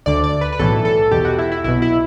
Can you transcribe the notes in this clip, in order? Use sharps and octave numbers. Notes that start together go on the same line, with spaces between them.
D2 D3 D5
D5
B4
B4
B1 A2 E3 A4
A4
E2 B2 G4
F#4
E4
E4
B1 B2 E4
E4